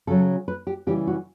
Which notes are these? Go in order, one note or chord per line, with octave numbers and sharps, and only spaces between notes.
C#3 F#3 A4
B4
G4
C#3 E3 G3 G4
F#4